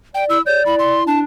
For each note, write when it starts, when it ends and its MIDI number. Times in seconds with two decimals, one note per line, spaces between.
0.15 0.38 74
0.15 0.25 79
0.30 0.40 64
0.30 0.41 88
0.46 0.61 73
0.46 1.00 74
0.46 0.63 91
0.66 1.20 64
0.66 0.75 83
0.79 1.04 84
1.07 1.24 62
1.07 1.19 81